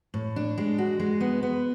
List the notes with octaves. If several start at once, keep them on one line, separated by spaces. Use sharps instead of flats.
A2
D4
G#3
F#4
G#3
B3
B3